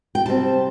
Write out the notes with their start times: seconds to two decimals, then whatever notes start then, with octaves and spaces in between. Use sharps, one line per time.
0.15 G5
0.25 C3 G3 C4 A5